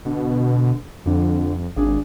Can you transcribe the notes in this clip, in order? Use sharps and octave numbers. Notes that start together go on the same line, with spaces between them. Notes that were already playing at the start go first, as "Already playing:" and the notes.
B2 D3
F2 D3
G#1 D4 G#4 F5